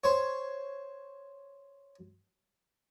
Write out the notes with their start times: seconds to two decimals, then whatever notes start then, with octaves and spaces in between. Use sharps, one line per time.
0.04 C5 C#5